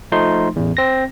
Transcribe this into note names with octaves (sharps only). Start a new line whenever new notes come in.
F3 A3 D#4 C6
A1 E2
C4 A#6